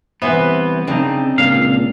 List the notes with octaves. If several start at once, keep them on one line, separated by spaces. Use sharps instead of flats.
C2 E3 B3 B4 C5 E5
C#3 C4 D4 D#4
C#2 A#2 F5